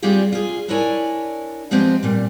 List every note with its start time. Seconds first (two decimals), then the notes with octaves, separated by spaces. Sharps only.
0.02 G3 C4 D4 F4 G4 G#4
0.32 F4 G#4
0.68 D4 E4 A#4 C#5 D5 G#5
1.71 F3 G#3 B3 C4 G4
2.03 A#2 G3